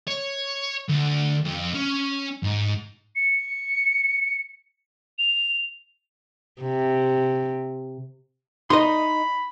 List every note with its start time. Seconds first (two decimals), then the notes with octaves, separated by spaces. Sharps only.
0.07 C#5
0.88 D2
1.45 F2
1.74 C#4
2.43 G#2
3.16 C#7
5.19 F7
6.62 C3
8.70 D#4 D#5 B5 C6